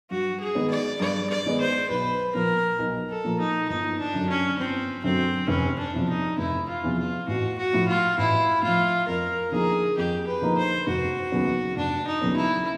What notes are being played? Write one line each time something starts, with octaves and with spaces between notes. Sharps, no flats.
G2 F#4
G#4
D#3 G#3 B3
D5
G2 D5
D5
D#3 G#3 B3
C5
B1 B4
A#2 F3 A#3 A#4
B1
A4
A#2 F3 A#3
D#4
G1 D#4
D4
F#2 D3 F#3
C#4
G1 C4
F#2 D3 F#3 C4
F1 C#4
D4
E2 C3 F3
D#4
F1 E4
F4
E2 C3 F3
F4
A1 F#4
F#4
A2 F3
F4
A1 E4
A2 F3 F4
F2 A#4
D3 F3 A#3 D#4 G#4
F2 G4
B4
D3 F3 A#3 D#4
C5
F1 F#4
D#2 C#3 F#3 B3
F1 D4
D#4
D#2 C#3 F#3 B3
E4